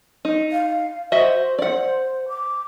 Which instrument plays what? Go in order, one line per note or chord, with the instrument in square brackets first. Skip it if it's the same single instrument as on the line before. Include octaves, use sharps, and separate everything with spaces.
[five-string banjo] D#4
[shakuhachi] F5
[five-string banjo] F#4 D#5 E5 [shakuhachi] C5
[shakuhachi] C5 [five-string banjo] D5 F#5
[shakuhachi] D6